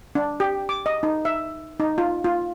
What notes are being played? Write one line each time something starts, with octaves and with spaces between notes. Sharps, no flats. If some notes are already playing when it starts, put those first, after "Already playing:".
D4
G4
D6
D#5
D#4
E5
D#4
F4
F4